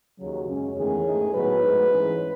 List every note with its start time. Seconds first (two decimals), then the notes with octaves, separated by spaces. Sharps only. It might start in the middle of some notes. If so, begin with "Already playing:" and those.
0.19 D#2 C#3 F#3
0.48 F#2 C#3 G#3 C#4
0.77 E2 D#3 A3 C#4 G#4
1.05 G#2 D#3 A3 D#4
1.33 A2 F#3 B3 D#4 B4
1.62 G#2 F#3 A3
1.90 G#2 E3 G#3 C#4